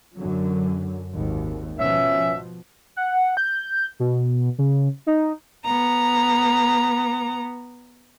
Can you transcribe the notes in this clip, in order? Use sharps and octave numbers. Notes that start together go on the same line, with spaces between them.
F#2 D3 F#3
G#1 D#2
B2 F3 C#4 E5
F#5
G6
B2
C#3
D#4
B3 A#5